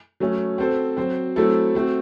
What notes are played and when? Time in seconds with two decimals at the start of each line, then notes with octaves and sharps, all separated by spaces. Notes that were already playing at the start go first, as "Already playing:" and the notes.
0.20 F#3 A3 C#4
0.58 C4 F#4 A4 C5
0.97 F#3 C4 F#4 C5
1.36 F#3 A3 C4 E4 A4
1.75 A3 C4 F#4